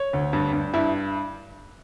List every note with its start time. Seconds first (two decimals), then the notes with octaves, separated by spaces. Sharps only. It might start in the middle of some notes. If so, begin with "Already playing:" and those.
Already playing: C#5
0.13 D2
0.33 G2
0.53 G2
0.74 G2 E4